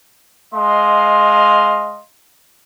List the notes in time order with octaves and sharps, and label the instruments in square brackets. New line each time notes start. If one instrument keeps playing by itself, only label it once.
[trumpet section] G#3 D#5 F5 C6